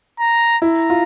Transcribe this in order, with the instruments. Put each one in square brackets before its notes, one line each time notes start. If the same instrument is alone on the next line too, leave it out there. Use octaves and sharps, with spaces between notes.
[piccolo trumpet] A#5
[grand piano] E4 [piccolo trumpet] A#5
[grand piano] F4